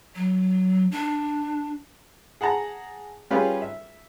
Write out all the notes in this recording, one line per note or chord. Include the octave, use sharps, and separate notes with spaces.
F#3
D4
G#4 F#5 A5 A#5
G3 C#4 F4 G4 G#4 B4
E5